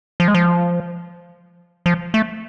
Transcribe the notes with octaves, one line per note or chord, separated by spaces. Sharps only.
F3
G#3
F3
F3
A3